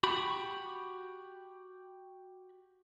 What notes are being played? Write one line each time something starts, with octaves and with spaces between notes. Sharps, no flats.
F#4 G4 B5